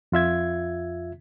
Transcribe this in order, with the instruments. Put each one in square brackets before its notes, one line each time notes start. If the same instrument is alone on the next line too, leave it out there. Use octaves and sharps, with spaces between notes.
[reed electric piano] F2 F4 E5 G#6